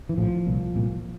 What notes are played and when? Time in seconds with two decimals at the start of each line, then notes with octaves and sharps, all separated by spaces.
0.09 E3
0.17 A#1 A2 F3
0.46 C2 A#2
0.74 C2 A#2